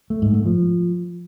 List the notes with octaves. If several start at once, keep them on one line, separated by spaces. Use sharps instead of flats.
A3
G#2
A3
F3